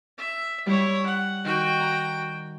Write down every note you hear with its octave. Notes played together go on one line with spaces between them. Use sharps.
E5
G3 E4 C#5
F#5
D#3 F#4 G5
A#5